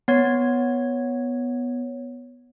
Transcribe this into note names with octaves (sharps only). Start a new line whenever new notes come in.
B3 C#5